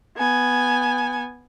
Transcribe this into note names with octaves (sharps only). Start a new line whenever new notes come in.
B3 G#5